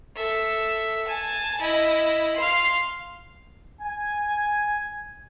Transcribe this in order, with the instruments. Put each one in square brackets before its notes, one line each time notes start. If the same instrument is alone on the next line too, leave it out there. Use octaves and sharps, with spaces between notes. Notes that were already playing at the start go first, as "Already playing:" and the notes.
[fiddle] A4 E5
G#5 A5
E4 D#5
F5 C6
[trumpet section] G#5